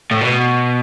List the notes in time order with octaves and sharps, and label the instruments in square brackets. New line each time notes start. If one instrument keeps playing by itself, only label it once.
[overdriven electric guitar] A2
B2